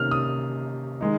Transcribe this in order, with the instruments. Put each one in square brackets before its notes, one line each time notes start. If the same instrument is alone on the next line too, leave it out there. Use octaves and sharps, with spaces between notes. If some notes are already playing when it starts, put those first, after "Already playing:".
Already playing: [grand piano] C3 D#3 A#3 C#4 F6
D#6
D#3 G#3 D#4